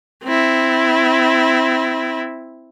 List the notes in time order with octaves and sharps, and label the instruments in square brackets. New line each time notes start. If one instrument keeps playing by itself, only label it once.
[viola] C4 E4